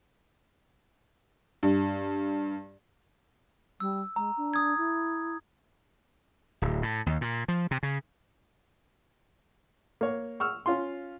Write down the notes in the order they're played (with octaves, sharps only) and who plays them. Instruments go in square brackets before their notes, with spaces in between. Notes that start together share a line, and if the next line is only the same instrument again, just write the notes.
[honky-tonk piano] G2
[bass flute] G3 [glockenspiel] E6
[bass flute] G#3 [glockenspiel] A#5
[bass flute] D4
[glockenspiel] D#6 G#6
[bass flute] E4
[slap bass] D1
A2
D#2
A#2
F3
C3
C#3
[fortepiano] A#3 C#5
C#6 E6 F6
C#4 F4 C6